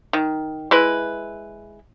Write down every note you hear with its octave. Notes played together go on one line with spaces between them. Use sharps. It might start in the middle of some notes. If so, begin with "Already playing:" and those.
D#3
G#3 E4 B4